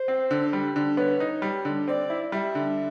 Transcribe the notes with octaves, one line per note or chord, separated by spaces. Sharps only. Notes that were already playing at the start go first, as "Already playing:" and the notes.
Already playing: C5
C4
D3
G3
D3
B3 C#5
D#4
G3
D3
C4 D5
E4
G3 E5
D3